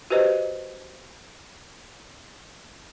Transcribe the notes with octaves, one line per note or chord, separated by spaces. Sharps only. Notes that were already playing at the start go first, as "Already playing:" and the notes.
F#4 G4 B4 C5 D#5